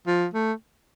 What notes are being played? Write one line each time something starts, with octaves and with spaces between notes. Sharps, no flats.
F3
A3